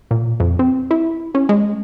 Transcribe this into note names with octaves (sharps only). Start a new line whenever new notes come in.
A#2
F2
C4
E4
C#4
G#3